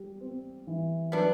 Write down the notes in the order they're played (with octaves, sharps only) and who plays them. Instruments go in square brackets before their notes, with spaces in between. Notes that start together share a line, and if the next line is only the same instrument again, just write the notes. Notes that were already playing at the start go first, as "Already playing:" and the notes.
Already playing: [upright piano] G3
C4
E3
[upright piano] F#3 [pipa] B3 D4